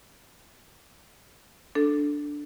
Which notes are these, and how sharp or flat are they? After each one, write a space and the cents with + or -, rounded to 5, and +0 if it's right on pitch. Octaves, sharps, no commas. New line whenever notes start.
D4 +0 A4 +0